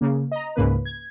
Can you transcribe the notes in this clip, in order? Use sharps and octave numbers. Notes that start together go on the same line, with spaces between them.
C#3 A#3
D#5 A#5
C#2 G#2 C#3 A#3 B4
G#6